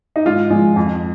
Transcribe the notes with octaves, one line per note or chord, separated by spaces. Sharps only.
D#4
G#2 F4
F3 G#3
F2